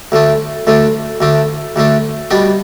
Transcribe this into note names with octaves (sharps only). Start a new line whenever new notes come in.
D2 D3 A3 D4
D2 D3 A3 D4
D2 D3 A3 D4
D2 D3 A3 D4
B2 G3 B3 D4